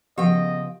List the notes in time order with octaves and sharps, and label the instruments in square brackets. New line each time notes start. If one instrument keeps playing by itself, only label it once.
[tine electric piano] C#3 B3 [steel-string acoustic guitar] F3 G5 [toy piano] G4 A#4 F#5 [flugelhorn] D#5